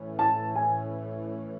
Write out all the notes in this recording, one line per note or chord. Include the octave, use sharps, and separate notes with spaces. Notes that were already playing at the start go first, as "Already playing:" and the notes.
Already playing: A2 E3 A3 C#4
A5
G#5